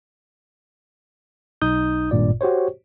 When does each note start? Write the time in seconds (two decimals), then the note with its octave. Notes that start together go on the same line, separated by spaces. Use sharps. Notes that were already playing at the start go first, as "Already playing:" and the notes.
1.62 B1 D#4 D#6 G6
2.11 G#1 G2 A#2 F4 D5
2.41 F#4 G4 C5 C#5